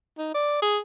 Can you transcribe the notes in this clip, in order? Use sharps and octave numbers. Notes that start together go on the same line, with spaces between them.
D#4
D5
G#4